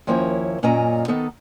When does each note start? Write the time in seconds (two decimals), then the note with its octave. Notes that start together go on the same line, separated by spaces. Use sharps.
0.07 D#2 F3 A#3 C#4 E4 C#5
0.63 F#2 A#2 A#3 C#4 D#5 A#5
1.08 D#3 B3 D#4 A4